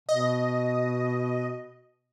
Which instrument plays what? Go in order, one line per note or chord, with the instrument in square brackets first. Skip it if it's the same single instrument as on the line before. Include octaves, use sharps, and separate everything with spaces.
[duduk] B2 [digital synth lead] D#5